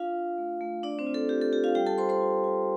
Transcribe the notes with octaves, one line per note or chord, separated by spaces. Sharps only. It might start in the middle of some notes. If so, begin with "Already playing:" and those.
Already playing: D4 F4 F5
D4
A3
A3
A3 D4 D5
C4 C5
F4
A4
F4 G4
A4
F4 G4
F4 F5
G3 G4 G5
A4 A5
F4 C5 C6
C5 C6
F4
F4